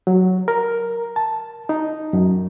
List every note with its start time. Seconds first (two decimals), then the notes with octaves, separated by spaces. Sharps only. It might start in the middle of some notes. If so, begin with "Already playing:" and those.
0.07 F#3
0.48 A#4
1.16 A5
1.69 D#4
2.13 F#2